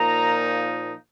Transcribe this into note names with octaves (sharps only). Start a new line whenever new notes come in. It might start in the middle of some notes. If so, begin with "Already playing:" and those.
Already playing: A#2 F3 A#3 D#4 A#5